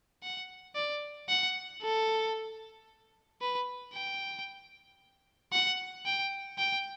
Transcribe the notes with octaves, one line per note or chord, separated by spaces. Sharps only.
F#5
D5
F#5
A4
B4
G5
F#5
G5
G5